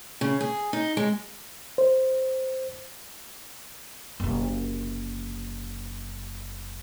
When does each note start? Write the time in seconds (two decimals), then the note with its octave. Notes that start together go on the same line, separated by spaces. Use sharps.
0.21 C#3
0.41 G#4
0.73 D#4
0.97 G#3
1.78 C5
4.20 F#1 C3